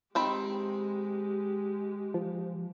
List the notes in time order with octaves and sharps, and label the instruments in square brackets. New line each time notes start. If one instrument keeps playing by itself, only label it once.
[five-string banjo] D#3 C4 B5 [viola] G#3 G4
[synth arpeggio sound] F3